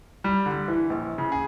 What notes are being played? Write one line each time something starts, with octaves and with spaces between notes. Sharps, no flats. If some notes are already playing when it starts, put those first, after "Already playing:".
G3
D3
E3
A#1
C#3
G#4